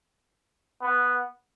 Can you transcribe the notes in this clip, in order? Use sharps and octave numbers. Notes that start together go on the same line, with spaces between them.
B3